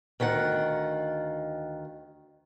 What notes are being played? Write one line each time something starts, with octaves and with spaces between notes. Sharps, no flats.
D2 D#3 F4 F#5